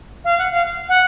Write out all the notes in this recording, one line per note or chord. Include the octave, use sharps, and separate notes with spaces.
F5
F#5
F5
F#5